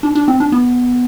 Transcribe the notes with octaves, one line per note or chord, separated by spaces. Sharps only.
D4
D4
C4
D4
B3